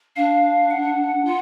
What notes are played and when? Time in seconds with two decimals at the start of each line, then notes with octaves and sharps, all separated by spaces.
0.16 D4 F5
0.71 F#5
1.25 F4